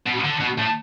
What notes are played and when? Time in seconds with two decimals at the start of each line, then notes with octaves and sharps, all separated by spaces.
0.06 B2
0.24 D3
0.40 B2
0.58 A2